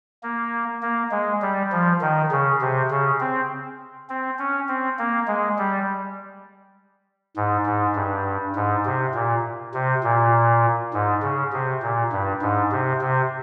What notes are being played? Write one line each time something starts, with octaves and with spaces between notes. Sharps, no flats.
A#3
A#3
G#3
G3
F3
D#3
C#3
C3
C#3
C4
C4
C#4
C4
A#3
G#3
G3
G#2
G#2
G2
G#2
C3
A#2
C3
A#2
G#2
C#3
C3
A#2
G2
G#2
C3
C3